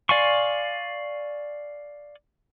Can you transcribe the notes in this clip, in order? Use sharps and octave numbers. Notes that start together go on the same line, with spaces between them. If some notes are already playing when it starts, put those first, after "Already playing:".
D5 F5 G#5 C6 C#6